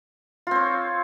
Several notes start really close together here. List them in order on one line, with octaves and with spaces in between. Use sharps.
F4 C4 C#5